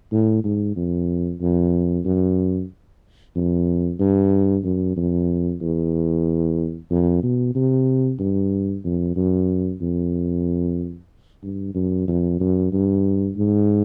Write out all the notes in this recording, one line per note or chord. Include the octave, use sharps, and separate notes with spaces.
A2
G#2
F2
F2
F#2
F2
G2
F#2
F2
E2
F2
B2
C3
G2
F2
F#2
F2
G2
F#2
F2
F#2
G2
G#2